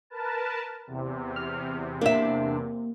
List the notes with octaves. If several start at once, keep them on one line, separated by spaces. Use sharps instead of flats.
A#4 B4 A5
E2 C3
F6
A#3 D4 E5